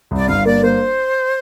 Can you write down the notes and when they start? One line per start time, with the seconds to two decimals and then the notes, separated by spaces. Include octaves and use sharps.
0.11 C2
0.16 D5
0.28 G1 F5
0.45 A#3 D5
0.63 A#3 C5